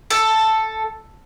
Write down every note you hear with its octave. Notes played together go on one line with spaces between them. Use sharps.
A4